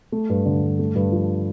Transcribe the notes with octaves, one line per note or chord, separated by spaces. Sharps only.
A3
G2
D3
G2
A3
G2
F3